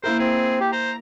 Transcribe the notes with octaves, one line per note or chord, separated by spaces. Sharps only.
A#3 E4 A#4 C5
C4 G#4
G4
C5 A#5